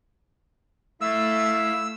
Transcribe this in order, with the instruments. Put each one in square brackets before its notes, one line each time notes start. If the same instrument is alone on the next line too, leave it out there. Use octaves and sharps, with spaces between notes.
[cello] A3 [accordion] E4 E5 F5 [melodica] E6